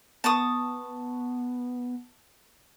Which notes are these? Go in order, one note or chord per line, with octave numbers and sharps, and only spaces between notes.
B3 A5 C#6 D#6